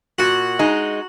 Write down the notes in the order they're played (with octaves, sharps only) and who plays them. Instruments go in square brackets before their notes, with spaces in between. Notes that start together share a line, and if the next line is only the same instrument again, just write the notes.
[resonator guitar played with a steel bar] A#2 [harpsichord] F#4
[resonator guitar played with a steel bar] G#3 D#4